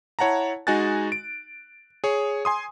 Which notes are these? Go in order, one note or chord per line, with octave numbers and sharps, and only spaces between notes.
E4 C#5 F#5 A5 A#5
G#3 D#4 F#4 G#5 F#6 A6
D7
G#4 C#5
G#5 C6 D#6